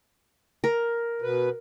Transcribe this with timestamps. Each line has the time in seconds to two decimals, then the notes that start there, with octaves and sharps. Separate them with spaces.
0.64 A#4
1.22 B2 B4